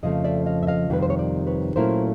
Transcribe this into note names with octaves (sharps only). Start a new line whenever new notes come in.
F2 C#3 F3 A3 D#5
D5 E5
D#5 F5
E5
D#5 F5
F2 C3 D#3 G3 B4
C5
C#5
C5 D5
B4 C#5
A#2 F#3 A3 C#4 E4 A#4 C5